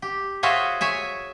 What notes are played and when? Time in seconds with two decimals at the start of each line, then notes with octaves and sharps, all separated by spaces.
0.02 G4
0.43 F#4 G#4 C5 C#5 E5 F5
0.81 C#5 E5 G#5